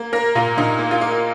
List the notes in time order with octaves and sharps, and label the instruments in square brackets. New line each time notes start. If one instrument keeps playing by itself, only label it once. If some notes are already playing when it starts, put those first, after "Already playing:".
Already playing: [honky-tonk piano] A#3
A#3 A#4
A#2 F4
A#2 D#4
A#3
F4
A#3